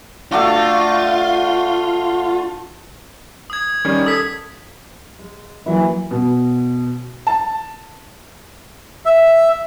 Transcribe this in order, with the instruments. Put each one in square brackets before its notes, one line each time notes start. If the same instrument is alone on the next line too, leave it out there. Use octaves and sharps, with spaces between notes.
[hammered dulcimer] A3 D4 F#4 [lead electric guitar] F4
[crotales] D#6 G#6
[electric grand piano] D#3 G3 C#4
[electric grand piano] A4 G#6 [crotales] D#6 B6
[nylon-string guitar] G#3
[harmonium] E3 [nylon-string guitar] F#3 A#3 E4
[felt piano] B2
A5
[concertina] E5